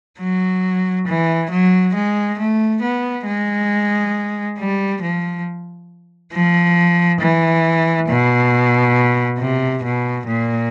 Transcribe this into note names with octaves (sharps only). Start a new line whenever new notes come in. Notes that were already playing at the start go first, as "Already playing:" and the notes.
F#3
E3
F#3
G#3
A3
B3
G#3
G3
F3
F3
E3
B2
C3
B2
A#2